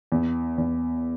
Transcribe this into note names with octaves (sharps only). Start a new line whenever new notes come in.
E2
E2